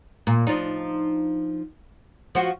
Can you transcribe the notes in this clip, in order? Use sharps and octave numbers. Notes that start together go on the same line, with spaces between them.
A#2
F3 D4 D#4
F3 F#4